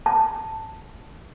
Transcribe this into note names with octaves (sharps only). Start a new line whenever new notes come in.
A5